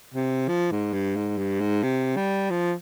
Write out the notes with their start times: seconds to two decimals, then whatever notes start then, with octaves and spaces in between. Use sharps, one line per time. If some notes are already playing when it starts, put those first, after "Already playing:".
0.14 C3
0.48 F3
0.71 G#2
0.93 G2
1.16 G#2
1.38 G2
1.61 G#2
1.83 C3
2.16 G3
2.50 F3